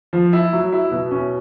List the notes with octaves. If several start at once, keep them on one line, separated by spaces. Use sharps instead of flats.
F3
E4
F#3
E4
B2
C#4